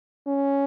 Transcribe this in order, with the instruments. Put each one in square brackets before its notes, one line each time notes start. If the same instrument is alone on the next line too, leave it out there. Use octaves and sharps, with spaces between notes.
[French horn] C#4